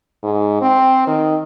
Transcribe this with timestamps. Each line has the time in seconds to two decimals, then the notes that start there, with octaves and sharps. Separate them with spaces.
0.23 G#2
0.61 C4
1.07 D#3